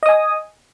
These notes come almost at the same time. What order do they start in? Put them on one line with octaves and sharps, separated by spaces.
D#5 D#6 G#5